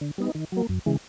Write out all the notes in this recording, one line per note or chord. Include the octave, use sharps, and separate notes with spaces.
D3
G3 B3 D#4
D#3
F#3 A#3
F#2
C#3 E3 G#3